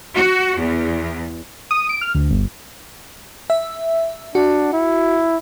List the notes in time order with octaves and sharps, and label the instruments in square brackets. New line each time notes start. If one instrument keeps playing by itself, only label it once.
[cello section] F#4
E2
[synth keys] D#6
D7
F6
D2
G1
[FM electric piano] E5
[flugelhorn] D4 [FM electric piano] F#4
[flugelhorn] E4